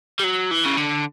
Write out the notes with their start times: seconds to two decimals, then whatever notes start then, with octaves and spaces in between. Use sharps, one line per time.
0.20 G3
0.24 F#3
0.51 E3
0.65 C#3
0.77 D3